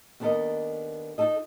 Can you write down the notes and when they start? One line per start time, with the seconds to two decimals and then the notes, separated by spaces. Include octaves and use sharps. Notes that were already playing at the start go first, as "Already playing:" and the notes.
0.20 D#2 B3 D4 A4 A#4 D#5
1.18 D#4 F4 A4 D#5